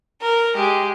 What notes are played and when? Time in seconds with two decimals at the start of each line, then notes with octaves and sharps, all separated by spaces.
0.21 A#4
0.55 G#3 G4